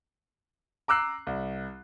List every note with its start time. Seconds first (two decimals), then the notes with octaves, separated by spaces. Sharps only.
0.88 A#5 D6 E6 F#6 C7
1.27 C2